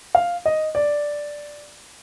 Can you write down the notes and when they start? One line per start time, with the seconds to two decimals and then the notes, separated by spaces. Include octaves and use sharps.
0.15 F5
0.46 D#5
0.75 D5